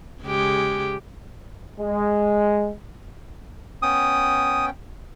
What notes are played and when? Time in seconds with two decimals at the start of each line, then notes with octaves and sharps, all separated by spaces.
0.23 C#3 G#3 G4
1.79 G#3
3.82 B3 C#4 G5 D#6